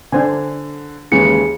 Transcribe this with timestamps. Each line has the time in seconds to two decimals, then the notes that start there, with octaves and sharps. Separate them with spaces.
0.12 D3 D4 C5 G#5
1.12 D#2 C#3 E3 G#3 C#7